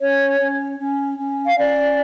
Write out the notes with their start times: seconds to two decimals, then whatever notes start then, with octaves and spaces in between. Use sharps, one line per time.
0.01 C#4 C#5
0.40 C#4
0.79 C#4
1.18 C#4
1.46 F5
1.57 C#4 D5